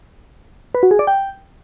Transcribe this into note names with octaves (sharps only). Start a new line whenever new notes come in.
B4
F#4
G#4
D5
G5